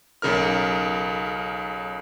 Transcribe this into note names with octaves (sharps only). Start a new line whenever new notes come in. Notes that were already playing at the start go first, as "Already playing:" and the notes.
B1 C#3 A#4 F6